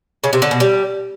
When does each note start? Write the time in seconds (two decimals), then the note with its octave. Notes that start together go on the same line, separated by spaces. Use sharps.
0.24 C#3
0.33 C3
0.42 D3
0.51 B2
0.60 G3